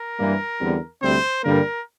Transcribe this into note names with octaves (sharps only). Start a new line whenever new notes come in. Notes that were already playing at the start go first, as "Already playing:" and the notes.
Already playing: A#4
G2 E3 G3 A#3
E2 D3 G3 C4
D2 C3 G3 C4 C5
G2 D3 G3 A#3 A#4